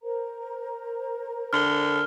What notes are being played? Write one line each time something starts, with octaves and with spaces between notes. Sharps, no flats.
A#4 C5 A#5
D3 F6 G7